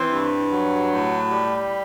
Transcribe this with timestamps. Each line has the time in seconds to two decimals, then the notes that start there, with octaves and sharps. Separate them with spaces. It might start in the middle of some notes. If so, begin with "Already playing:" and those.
Already playing: E3 C4 C5
0.11 G2
0.51 F#3
0.92 A2
1.32 G3